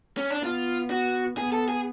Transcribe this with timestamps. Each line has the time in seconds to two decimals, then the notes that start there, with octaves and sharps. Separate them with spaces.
0.17 C#4
0.31 D4
0.44 B3 F4
0.90 F#4
1.38 B3 G#4
1.53 A4
1.68 G#4